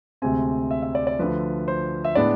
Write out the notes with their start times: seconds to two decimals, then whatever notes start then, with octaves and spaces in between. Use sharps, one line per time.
0.22 D2 C3 G#3 C4 G#5
0.71 E5
0.82 E5
0.95 D5
1.07 D5
1.19 D2 D3 F3 B4
1.68 C5
2.04 E5
2.15 A2 G#3 B3 D4 D5